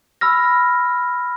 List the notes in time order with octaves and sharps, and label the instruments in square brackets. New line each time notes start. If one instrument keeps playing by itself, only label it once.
[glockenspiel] B5 E6 F6 A#6